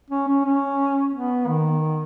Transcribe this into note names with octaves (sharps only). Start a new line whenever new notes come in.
C#4
C#4
C#4
B3
D#3